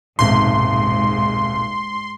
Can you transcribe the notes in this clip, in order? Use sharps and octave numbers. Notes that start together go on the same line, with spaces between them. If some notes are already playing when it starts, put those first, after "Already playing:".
D#1 B1 G#2 C3 C6